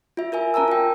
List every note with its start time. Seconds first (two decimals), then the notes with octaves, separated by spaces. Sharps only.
0.17 F4 E5
0.32 F4 A#4 E5 G#5
0.54 C#4 A#4 A5 A#5 E6
0.68 F4 G5